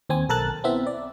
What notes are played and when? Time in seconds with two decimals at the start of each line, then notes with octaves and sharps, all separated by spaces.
0.09 D#2 C4 G#5
0.29 B1 A4 A#4 A5 F#6 A6
0.64 B3 C4 E4 E5
0.87 D5